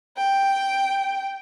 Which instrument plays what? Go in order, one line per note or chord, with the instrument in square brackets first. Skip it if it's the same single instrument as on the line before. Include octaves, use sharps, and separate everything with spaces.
[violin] G5